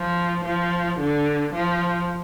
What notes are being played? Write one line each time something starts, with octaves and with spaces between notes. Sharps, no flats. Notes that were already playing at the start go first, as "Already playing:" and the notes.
Already playing: F3
F3
D3
F3